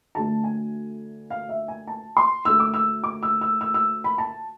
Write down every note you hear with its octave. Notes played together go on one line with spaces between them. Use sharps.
D2 D3 A3 A5
G#5
F5
E5
G#5
A5
C6
D2 D3 A3 E6
D6
E6
D6
E6
E6
E6
E6
B5
A5